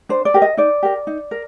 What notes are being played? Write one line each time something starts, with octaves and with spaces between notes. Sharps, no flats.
D4 C5
D5
G4 A#4
D#5
D#4 D5
G4 A#4
D#4
A#4